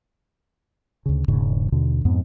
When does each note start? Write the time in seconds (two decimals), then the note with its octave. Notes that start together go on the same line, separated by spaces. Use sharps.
1.06 D2 C#3
1.28 E1 G#2 C#3
1.72 D#2 B2 D3
2.05 F2 G#2 B3